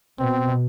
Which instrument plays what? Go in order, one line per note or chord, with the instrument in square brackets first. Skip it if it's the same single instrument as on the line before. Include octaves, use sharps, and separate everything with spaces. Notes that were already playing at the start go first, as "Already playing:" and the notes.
[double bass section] B2 [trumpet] C4